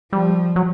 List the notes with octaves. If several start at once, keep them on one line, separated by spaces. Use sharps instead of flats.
F3 G3
F#3